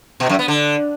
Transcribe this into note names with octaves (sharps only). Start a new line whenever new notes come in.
B2
F#2
B3
D3